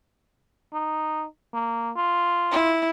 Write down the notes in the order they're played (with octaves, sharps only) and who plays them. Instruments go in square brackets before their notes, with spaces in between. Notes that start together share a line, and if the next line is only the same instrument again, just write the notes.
[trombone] D#4
A#3
F4
[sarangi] E4